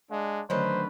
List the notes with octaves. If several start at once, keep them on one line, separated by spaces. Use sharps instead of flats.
G#3 D4 F5
D3 D#3 F#3 A3 C#4 B4 C5